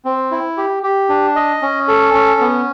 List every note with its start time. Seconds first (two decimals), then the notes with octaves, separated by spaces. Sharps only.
0.05 C4
0.31 E4
0.57 G4
0.83 G4
1.09 D4
1.36 D#5
1.62 C#4
1.88 A4
2.14 C#4
2.40 B3